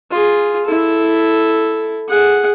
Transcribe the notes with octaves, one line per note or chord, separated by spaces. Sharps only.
F4 G#4
E4 A4
G#4 F#5